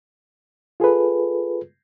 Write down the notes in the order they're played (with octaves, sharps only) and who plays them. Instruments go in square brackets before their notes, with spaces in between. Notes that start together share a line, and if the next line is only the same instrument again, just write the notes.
[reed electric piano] F4 G#4 A4 B4